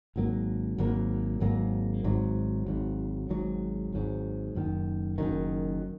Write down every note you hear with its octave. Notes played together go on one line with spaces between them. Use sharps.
G#1 G#2 F#3 A#3
G#1 G#2 F#3 A#3
G#1 G#2 F#3 A#3
G#1 G#2 F#3
G#1 G#2 F#3
G#1 G#2 F#3
G#1 G#2 F#3
F#1 F#2 D#3
F#1 F#2 D#3